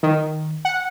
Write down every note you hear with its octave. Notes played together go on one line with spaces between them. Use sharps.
D#3
F#5